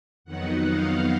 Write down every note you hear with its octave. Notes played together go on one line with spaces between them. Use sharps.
F2 D#3 F#3 B3 D#4 F#5
F5